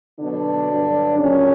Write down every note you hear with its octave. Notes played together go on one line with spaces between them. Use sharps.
B2 D3 F#3 D4
G2 F#3
A#2 C#3 F#3 C#4